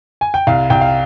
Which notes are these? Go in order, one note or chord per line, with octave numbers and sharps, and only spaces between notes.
G#5
G5
C2 F5
C2 G5
F5